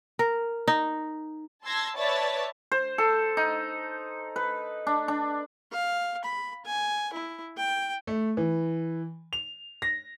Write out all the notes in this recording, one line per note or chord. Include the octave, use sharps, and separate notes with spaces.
A#4
D#4
A5 C6 E6 G#6 A#6
B4 C#5 D5 E5 A5 A6
C5
A4
D#4
B4
D4
D4
F5
B5
G#5
E4
G5
A3
E3
F7
A#6